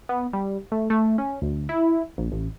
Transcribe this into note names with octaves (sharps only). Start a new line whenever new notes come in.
B3
G3
A3
A3
C#4
D2
E4
A#1
A1